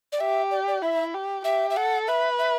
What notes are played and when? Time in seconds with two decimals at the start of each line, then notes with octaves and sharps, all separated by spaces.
0.12 D5
0.20 G4 E5
0.51 D5
0.68 D5
0.82 E4 E5
1.14 G4
1.44 G4 E5
1.70 E5
1.76 A4 F#5
2.07 B4 E5
2.39 E5